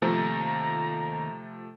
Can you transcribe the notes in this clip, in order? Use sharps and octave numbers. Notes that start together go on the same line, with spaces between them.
D#2 C3 F3 A3 A#5